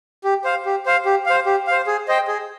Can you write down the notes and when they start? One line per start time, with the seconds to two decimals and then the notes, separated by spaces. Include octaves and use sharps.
0.24 G4
0.44 C5 F5
0.66 G4
0.86 C5 F5
1.05 G4
1.26 C5 F5
1.46 G4
1.67 C5 F5
1.87 G#4
2.08 C5 D#5 G5
2.28 G#4